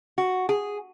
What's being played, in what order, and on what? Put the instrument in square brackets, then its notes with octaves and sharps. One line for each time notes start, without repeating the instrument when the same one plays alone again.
[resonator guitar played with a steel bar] F#4
G#4